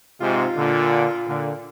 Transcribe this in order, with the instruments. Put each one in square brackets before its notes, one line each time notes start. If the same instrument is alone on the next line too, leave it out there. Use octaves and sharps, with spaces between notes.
[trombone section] G#2 C3 [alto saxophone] F4
[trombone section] A#2 D3
A#2 D3